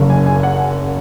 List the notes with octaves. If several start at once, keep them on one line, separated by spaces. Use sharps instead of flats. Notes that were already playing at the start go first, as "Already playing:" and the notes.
Already playing: F#1 F#2 C#3
G#5
G#5
F#5